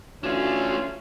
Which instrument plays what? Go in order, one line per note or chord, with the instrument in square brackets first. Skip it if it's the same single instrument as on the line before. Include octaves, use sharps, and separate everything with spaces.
[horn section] E3 C#4 F4 [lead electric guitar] A3 D4 [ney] F#4